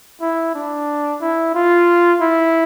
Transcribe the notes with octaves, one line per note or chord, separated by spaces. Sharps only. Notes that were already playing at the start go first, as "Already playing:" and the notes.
E4
D4
E4
F4
E4